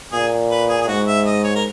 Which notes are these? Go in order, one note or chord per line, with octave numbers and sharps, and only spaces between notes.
A#2 G#4
B4
G#4
G#4
G#2 F#4
E5
D#5
C#5
A#4